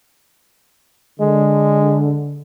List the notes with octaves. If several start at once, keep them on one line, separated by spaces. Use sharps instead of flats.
D3 G#3